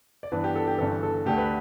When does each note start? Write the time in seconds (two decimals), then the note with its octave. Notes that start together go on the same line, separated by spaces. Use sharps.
0.23 D5
0.32 G2 E3 B3 D4 B4
0.44 G4
0.56 A4
0.67 G4
0.78 G1 G2 E3 A4
1.03 A4
1.25 D2 D3 A3 D4 G4
1.38 B4